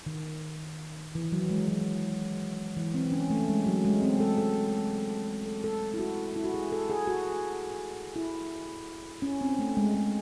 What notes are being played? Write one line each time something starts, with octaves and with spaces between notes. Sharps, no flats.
D#3
E3
F#3
G#3
F#3
E3
C4
C#4
A3
G#3
F#3
G#3
C4
A4
A4
A4
A4
E4
F#4
E4
F#4
G#4
A4
G#4
F#4
E4
C#4
C4
A3
G#3
G#3